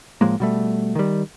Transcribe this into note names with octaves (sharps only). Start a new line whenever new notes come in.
A2 F3 G#3 A#3
B2 G3 A3
D#3 G3